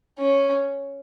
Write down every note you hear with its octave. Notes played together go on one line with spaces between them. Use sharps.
C#4